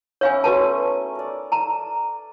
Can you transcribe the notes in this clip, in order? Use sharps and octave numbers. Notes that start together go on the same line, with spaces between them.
B3 C#4 E4 C#5 F5 G#5
A3 B3 D#4 F#4 B4 A5
A#4 D5
A5 A#5